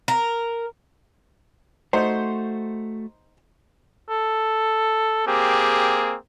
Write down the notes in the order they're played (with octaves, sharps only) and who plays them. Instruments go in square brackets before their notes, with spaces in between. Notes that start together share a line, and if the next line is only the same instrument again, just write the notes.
[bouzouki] A#4
[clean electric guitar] A3 F#4 [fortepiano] D#4 C5
[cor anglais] A4
[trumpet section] A#3 C4 G#4 [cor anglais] G4